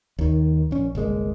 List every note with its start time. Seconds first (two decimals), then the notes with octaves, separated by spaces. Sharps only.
0.19 D#2 D#3
0.71 A#1 C#4
0.95 G1 C2 G#3 A#3